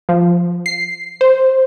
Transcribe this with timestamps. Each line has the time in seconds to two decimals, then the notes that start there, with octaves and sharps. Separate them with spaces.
0.09 F3
0.66 C7
1.21 C5